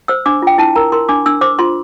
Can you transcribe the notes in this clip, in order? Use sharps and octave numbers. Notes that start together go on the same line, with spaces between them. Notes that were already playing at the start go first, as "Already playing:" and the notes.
C5 E6
D4 D6
F4 G5
E4 A5
A#4 A#5
A#4 C6
D4 D6
D4 E6
C5 D6
F4 C6